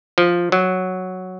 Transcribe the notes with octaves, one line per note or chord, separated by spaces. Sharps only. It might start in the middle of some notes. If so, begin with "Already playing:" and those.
F3
F#3